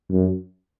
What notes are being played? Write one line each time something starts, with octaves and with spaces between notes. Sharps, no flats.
F#2